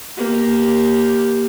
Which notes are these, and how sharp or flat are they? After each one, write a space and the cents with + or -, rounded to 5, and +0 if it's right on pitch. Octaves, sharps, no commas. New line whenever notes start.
A#3 +0 G4 +0